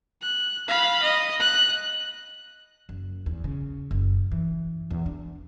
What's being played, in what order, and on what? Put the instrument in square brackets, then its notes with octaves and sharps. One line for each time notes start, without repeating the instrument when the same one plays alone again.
[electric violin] F#6
F5 B5
D#5
F#6
[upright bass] F#1
E2
C#3
F#1
E3
E2
D4